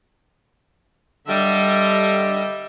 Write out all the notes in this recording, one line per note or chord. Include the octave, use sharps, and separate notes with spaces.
D3 G3 D#5 E5